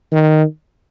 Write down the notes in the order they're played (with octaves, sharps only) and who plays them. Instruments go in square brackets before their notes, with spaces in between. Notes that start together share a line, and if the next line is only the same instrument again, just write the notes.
[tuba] D#3